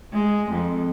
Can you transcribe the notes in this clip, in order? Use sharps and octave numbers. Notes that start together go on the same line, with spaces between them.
G#3
F2